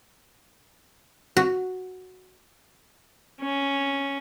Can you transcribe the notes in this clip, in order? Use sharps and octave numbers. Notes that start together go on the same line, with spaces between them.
F#4
C#4